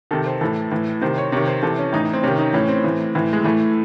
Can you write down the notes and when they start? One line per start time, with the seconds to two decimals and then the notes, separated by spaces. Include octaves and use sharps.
0.11 C3 D#3 A4
0.26 C5
0.41 A2 E3 A4
0.71 A2 E3
1.01 C3 D#3 C5
1.18 C#5
1.32 C3 D#3 C#5
1.47 C5
1.62 C3 E3 A4
1.79 C#4
1.93 A2 E3 D#4
2.03 D#4
2.13 C4
2.23 C3 D#3 C#4
2.38 D#4
2.53 A2 E3 C#4
2.68 C4
2.84 A2 E3
3.15 A2 E3
3.33 G#3
3.44 A2 E3 A3